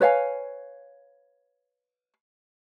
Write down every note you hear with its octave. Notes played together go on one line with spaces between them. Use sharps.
B4 C#5 F5 G#5